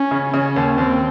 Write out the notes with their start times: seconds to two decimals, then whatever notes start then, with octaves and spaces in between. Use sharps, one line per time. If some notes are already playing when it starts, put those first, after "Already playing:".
Already playing: C#4
0.11 C#3
0.34 C#3 C#4
0.56 D#2
0.78 D#2 C4